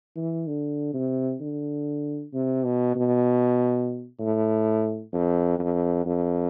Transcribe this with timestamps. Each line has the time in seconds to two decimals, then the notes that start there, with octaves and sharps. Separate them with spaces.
0.16 E3
0.47 D3
0.93 C3
1.41 D3
2.33 C3
2.65 B2
2.95 B2
4.19 A2
5.13 F2
5.59 F2
6.06 F2